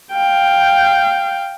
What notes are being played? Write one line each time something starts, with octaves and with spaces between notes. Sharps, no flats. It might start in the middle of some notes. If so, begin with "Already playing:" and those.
F5 G5